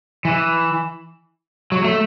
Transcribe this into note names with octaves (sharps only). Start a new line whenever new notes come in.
E3
F#3
A3